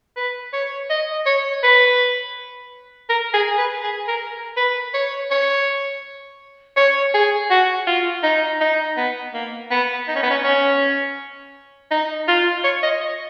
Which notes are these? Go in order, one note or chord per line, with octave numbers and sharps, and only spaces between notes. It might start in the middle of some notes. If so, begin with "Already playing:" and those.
B4
C#5
D#5
C#5
B4
A#4
G#4
B4
G#4
A#4
B4
C#5
C#5
C#5
G#4
F#4
F4
D#4
D#4
B3
A#3
B3
D#4
C#4
B3
C#4
C#4
D#4
F4
C#5
D#5